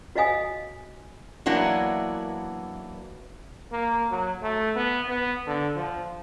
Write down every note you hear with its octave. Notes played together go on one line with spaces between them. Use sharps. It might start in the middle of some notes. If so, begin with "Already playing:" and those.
F#4 C#5 D#5 F5 G#5 D#6
E3 F#3 A#3 B3 D4
A#3
F#3
A3
B3
B3
D3
F3